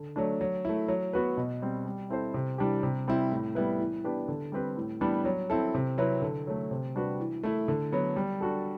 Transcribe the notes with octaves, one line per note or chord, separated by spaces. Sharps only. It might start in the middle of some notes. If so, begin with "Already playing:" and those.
Already playing: D3
F#3 A3 D4
F#3
A3 E4
F#3
B3 F#4 B4
B2
G3 C4
G3
C4 E4 A4 C5
C3
E3 G3 D4 G4
C3
G3 C4 E4
A2
G3 B3 E4 B4
E3
B3 D4 G4 B4
D3
G3 C4 G4 B4
A2
E3 G3 B3 D4
F#3
C4 E4 A4
C3
F#3 C4 E4 B4
D3
F#3 A3
C3
G3 D4 F#4 B4
E3
A3 E4
D3
F#3 B3
G3
D4 F#4 A4